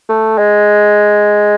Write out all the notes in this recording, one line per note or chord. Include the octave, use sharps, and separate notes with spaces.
A3
G#3